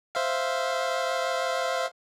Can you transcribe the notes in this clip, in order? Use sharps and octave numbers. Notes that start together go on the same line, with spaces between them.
C5 E5 F5